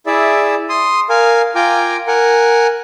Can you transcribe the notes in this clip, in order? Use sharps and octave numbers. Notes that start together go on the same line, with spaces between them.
E4 G#4 D5 E5
C6 D#6
A#4 F5 G#5
F4 G5 G#5 A#5 D6
A#4 F#5 G#5